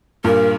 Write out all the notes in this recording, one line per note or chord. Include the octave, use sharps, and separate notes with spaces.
G2 A#2 A#4